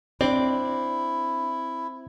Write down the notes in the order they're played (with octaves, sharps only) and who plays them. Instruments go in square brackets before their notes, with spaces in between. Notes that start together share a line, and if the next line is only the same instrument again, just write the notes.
[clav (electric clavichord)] C4 [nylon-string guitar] D4 D5 [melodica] E4